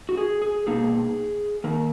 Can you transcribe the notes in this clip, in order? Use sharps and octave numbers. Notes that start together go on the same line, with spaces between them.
F#4
G#4
G#4
B2 A#3 D#4 G#4
D#3 A#3 D#4 A#4